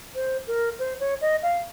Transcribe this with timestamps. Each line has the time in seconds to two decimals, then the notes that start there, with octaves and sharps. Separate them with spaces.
0.15 C5
0.47 A#4
0.79 C5
1.00 C#5
1.21 D#5
1.42 F5